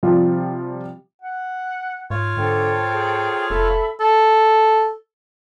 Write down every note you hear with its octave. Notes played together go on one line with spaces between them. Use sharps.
C3 F3 G3 F4
F#5
G#2 F4 C#5
G#2 D3 A4 C5 G5
G#4
F1 A4 E5 B5 E6
A4